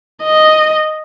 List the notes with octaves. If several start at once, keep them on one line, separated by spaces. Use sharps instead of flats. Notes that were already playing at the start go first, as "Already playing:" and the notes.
D#5